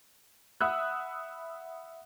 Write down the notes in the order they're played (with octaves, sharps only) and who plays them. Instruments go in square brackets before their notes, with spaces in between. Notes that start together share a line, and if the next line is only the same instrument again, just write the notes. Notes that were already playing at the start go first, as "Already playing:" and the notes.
[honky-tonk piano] E5 F#5 B5 D#6 E6 F#6